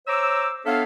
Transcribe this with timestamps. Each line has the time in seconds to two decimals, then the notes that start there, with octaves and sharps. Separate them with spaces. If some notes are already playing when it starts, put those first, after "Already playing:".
0.08 C5 C#5 A#5 D6 E6
0.66 B3 D4 A4 C#5 E5 F5